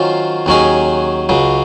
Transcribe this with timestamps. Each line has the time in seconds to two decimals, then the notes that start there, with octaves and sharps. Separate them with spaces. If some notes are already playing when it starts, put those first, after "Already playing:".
Already playing: D#3 F#3 C#4 F4 C5
0.46 D#2 D#3 F#3 C#4 G#4
1.29 C#2 C#3 F#3